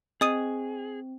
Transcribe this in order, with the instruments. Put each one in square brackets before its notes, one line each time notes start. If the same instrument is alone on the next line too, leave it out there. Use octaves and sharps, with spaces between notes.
[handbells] C4 [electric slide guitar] G#4 [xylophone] D#5 D#6 D#7